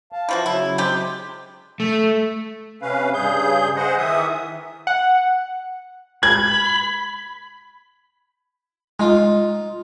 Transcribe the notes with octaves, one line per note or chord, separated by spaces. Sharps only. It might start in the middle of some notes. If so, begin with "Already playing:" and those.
F5 A5
E3 F3 F#4
C#3 F#3 E4
C3 G#3 G4
A3
C3 C#4 B4 F5
G2 C#3 G#4 G6
G#4 C5 D#5 F#5
D#3 E3 E5 D#6
F#5
B5 G#6
G#3 D#4 F4